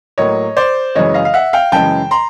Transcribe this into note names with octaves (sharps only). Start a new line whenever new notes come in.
A2 F#3 A#3 C#5 D#5
C5 D5
F#2 C#3 E3 G#3 C#5 D#5
D#5 F5
F5
E5 F#5
F5 G5
F#2 C#3 E3 G#3 G5 A5
A#5 C6